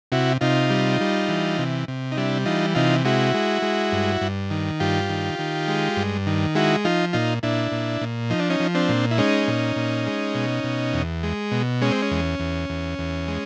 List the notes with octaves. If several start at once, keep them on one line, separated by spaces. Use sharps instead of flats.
C3 E4 F#4
C3 D#4 F4
G3
G3
E3
C3
C3
D#4
G3 D4 E4
E3 D#4 F4
C3 D#4 F4
G#3 E4 F#4
G#3
G#3
G2
G2
D#3
G2 F4 G4
D#3
D#3
G#3
G2
D#3
G#3 E4 F#4
F3 D#4 F4
A#2 D#4 F4
A#2 D4 E4
A#2
A#2
F3 D#4
D4
C#4 D#4
F3
C4 D4
A#2
E4
G#3 C#4 D#4
A#2
A#2
G#3
B2
B2
E2
G#3
B2
G#3 C#4
C4
C#4
E2
E2
E2
E2
G#3